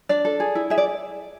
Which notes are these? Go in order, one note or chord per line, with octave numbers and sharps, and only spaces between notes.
D4 D5
A4
G#4
E4
G#4 E5
D5